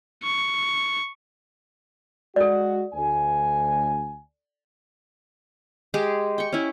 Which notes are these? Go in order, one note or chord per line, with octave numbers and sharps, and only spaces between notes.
C#6
G#3 F#4 A4 D5
D2 G#5
G#3 G4 G#4
G5 C#6
C#4 E4